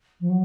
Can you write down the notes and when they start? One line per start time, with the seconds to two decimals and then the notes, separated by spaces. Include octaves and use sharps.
0.20 F3
0.29 F#3